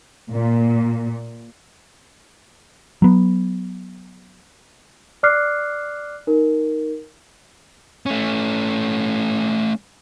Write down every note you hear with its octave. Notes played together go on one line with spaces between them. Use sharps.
A#2
F#3 B3
D5 D6 F6 F#6 C7
D#4 A#4
A3 C#4